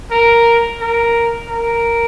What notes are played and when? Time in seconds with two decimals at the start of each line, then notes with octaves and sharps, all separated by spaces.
0.11 A#4
0.81 A#4
1.49 A#4